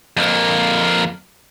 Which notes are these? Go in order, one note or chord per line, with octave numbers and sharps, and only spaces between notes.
F2 A#3